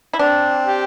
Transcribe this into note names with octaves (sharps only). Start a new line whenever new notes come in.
E4
C4 D4
G4